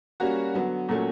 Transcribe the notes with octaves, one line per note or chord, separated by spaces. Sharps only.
G3 A#3 C#4 F#4
D3 F#3 B3
A#2 F#3 A3 C#4